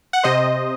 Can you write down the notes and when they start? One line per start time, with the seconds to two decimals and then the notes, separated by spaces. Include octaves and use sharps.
0.13 F#5
0.23 C3 C5 D#5